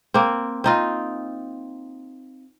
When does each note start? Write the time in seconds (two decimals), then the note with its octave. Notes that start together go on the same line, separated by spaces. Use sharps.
0.14 A#3 C4
0.64 C4 D#4 F4